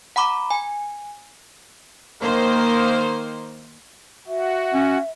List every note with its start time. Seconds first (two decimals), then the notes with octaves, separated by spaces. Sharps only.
0.16 F#5 A#5 B5 D6
0.51 G#5
2.21 D#3 A#3 C5
4.27 F#4 E5
4.74 C#4